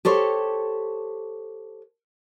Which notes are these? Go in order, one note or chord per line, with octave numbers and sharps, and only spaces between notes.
G4 A4 C5 C#5